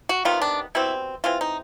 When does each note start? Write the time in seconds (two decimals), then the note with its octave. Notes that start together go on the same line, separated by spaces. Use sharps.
0.09 F#4
0.25 C3 D#3 G3 B3 F4
0.42 D4
0.75 B2 G3 C4 E4
1.24 E3 G#3 C4 F4
1.41 D#4